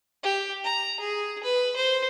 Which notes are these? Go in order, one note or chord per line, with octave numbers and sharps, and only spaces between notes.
G4
A#5
G#4
B4
C5